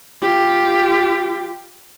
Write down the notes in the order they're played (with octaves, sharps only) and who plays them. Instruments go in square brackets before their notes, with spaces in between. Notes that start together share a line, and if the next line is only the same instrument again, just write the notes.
[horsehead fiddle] F4 G4